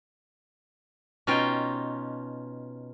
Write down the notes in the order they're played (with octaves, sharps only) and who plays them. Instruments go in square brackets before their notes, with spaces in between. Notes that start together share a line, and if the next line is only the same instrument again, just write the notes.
[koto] B2 C#4 D#4 F4 G5